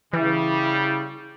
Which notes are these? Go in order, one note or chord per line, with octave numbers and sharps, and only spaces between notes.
C#3 E3 G3 E4